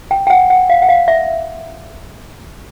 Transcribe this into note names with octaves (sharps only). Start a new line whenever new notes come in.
G5
G5
F#5
F#5
F5
F#5
F5
E5